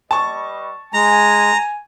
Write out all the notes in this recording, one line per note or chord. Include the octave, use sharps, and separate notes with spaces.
G3 B4 D#5 A5 C#6
G#3 G#5 A#5